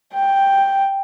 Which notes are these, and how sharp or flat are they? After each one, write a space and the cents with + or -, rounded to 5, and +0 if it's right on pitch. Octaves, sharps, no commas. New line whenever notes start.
G5 +5